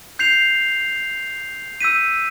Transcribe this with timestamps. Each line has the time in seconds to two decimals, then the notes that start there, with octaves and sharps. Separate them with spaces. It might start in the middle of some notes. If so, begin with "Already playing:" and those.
0.19 G6 C7 F7
1.81 E6 G6 B6 D#7